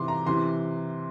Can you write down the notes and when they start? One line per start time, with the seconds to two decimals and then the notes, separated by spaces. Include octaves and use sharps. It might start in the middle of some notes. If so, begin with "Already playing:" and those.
Already playing: C3 E3 C6 D6
0.08 A#5
0.26 C3 E3 C6